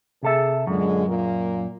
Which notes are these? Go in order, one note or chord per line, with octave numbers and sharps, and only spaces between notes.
C3 G#4 A4 E5
F#2 A#2 D3 G#3
A#2 A#3